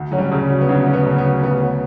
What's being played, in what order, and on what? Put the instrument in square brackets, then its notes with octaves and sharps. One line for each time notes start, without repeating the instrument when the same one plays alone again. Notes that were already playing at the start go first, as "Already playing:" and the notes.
Already playing: [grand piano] D2
[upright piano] F#3 [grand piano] C#4
[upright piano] G3
[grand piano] C#3
F#3
[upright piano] B3
[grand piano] D2 [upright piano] C#4
[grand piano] C#4
[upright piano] B3
[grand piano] C#3
[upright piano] B3
[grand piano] F#3
[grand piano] D2 [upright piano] B3
[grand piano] C#4